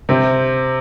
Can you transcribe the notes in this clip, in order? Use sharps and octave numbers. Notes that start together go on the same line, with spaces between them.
C3 C4